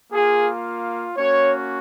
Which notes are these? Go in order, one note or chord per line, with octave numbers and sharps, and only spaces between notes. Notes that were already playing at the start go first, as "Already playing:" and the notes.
A#3 F4 G#4
A#3 C#4 F#4 C#5